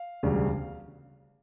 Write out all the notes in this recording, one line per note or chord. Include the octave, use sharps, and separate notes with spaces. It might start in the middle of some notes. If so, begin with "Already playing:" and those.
Already playing: F5
E1 D2 C#3 G3